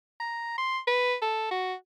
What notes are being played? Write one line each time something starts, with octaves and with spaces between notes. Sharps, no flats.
A#5
C6
B4
A4
F#4